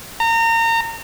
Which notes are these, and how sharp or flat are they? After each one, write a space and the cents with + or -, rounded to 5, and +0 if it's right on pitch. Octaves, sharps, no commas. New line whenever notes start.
A#5 -30